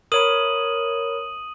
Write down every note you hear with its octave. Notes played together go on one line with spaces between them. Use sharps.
A#4 C#5 B5 D#6 D#7 F#7